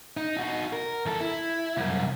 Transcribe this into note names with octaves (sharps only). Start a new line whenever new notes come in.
D#4
D#4 F#4
A#4
E2 A4
E4
C2 F#2